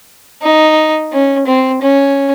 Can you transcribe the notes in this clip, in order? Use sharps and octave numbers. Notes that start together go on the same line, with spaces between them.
D#4
C#4
C4
C#4